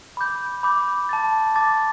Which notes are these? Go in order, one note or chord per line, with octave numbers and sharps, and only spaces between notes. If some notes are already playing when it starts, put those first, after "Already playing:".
B5 D6 G6
B5 D6 G6
A5 D6 A6
A5 D6 A6